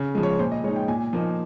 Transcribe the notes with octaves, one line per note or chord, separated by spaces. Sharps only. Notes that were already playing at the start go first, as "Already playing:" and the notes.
Already playing: C#3
F3 G#3
C#5
A#2 C5
D#5
G#3 D#4 C#5
G5
A#2 G#5
F3 A#3 D#4